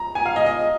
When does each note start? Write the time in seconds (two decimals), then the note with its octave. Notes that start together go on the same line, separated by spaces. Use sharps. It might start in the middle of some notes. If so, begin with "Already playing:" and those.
Already playing: A#5
0.15 G#5
0.26 F5
0.36 D#5
0.46 D#5